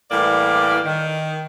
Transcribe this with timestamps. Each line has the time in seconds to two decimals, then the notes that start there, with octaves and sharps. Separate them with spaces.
0.10 A2 E3 G3 A#3 D5
0.86 D#3